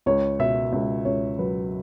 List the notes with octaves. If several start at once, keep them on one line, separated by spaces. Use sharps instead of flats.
C#2 C#5
B2 E5
C#2 E5
C#2 C#5
F#3 B4